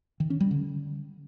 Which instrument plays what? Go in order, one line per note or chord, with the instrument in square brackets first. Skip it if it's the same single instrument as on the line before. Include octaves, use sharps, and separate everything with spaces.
[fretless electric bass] D#3
C#4
G3
D3